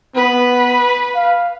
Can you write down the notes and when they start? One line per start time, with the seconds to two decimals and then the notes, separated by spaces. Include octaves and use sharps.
0.15 B3 B4
1.15 F5